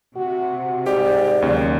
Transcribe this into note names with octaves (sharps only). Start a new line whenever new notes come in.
C3 F#4
G#2 G4 D5
D#2 C#3 F#3